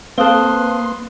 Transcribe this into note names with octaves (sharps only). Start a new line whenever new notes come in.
A#3 C4 A4 B4 F5 C6 D#6 F#6